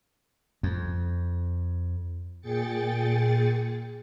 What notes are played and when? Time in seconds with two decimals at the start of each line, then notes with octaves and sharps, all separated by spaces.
0.63 F2
2.41 A#2 G#4 G5 A6 C#7